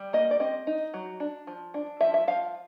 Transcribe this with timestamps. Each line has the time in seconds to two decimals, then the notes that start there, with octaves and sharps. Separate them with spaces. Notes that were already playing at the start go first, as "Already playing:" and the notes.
Already playing: G3
0.13 A#3 D#5
0.31 D5
0.40 C4 D#5
0.67 D#4
0.94 F#3
1.20 D4
1.47 F3
1.74 D4
2.01 F3 E5
2.14 E5
2.27 F3 F5